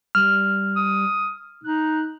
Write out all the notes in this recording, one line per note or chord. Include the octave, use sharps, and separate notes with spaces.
G3 F6
D#6
D#4 F#6